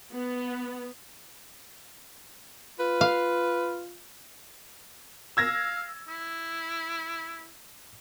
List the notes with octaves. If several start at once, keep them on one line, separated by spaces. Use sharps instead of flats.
B3
F4 B4
F5
F5 E6 G#6 A#6
E4